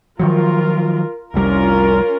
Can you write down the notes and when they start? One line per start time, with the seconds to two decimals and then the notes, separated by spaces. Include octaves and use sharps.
0.20 D#3 F3 F#3 F4 A#4
1.34 F1 C2 G3 C#4 F4 A#4